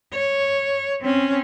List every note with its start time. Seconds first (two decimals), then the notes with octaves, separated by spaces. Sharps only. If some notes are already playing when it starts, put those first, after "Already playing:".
0.13 C#5
1.01 C4 C#4